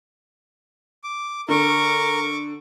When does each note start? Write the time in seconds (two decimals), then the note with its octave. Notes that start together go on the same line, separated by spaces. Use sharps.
1.04 D6
1.49 D3 A#4 C#6 D6